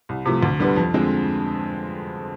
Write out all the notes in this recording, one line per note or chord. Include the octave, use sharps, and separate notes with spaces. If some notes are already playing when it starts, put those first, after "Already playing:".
C2
C3 F3 A3
D2
D3 G3 B3
F2
D3 F3 G#3 C4